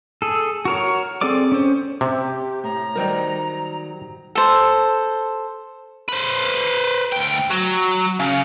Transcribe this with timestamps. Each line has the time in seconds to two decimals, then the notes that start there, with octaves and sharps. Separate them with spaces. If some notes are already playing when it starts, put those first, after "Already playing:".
0.22 G#4 A4
0.65 F#4 A#4 C#5
1.21 C4 G#4 A4 D5 D6
1.52 C#4 C5
2.01 C3 G4
2.64 A2 A#5
2.96 D#3 F#3 G3 A#4 C5 D5
4.35 A4 C5
6.09 B4 C5
7.12 D2 G5
7.50 F#3
8.19 C#3